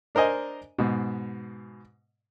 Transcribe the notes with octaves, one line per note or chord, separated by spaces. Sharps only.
D4 A#4 C5 D#5 G#5
G#2 B2